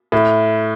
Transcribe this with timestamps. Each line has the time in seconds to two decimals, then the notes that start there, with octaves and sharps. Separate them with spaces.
0.12 A2